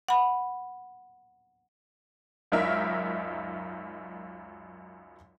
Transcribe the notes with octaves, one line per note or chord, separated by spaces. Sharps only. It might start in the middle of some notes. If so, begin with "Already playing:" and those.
F#5 B5
G#1 C#2 F#2 D#4 A#4 E5